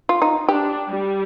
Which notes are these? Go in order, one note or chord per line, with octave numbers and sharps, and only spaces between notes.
F4
D#4
D4 G4
G3